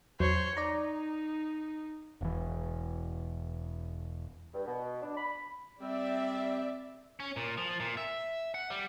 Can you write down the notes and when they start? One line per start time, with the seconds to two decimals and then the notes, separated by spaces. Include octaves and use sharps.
0.20 E2 F#3 C5 C#5
0.57 D#4 D5 A#5
2.21 E1 E3
4.53 G2
4.66 B2
5.03 D4
5.17 B5
5.81 G3 C4 D5 E5
7.20 C#4
7.37 A#2
7.58 F3
7.80 A#2
7.97 E5
8.54 F#5
8.70 G3